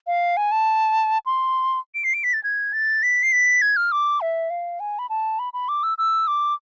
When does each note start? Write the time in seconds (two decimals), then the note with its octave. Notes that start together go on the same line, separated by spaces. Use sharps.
0.07 F5
0.37 G#5
0.52 A5
1.26 C6
1.95 D7
2.04 C7
2.14 D7
2.24 B6
2.34 A6
2.44 G#6
2.73 A6
3.03 B6
3.23 C7
3.32 B6
3.62 G#6
3.77 F6
3.92 D6
4.21 E5
4.50 F5
4.80 G#5
4.99 B5
5.10 A5
5.39 B5
5.53 B5
5.69 D6
5.83 E6
5.98 E6
6.27 D6